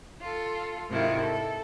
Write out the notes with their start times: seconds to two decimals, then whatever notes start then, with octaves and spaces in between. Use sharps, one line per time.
0.21 F4 A4
0.89 G#2 C3 D#3 E4 F4
1.20 A4